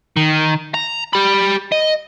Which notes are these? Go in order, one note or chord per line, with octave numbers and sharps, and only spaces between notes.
D#3
A#5
G4 B5
D#5